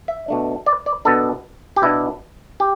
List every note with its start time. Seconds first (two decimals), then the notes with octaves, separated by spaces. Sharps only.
0.08 E5
0.28 B2 A3 D4
0.66 D5
0.86 D5
1.05 B2 B3 D4 A4
1.76 G4
1.82 B2 B3 D4 E4
2.60 G4